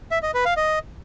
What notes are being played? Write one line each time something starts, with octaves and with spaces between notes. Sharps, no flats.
E5
D#5
B4
F5
D#5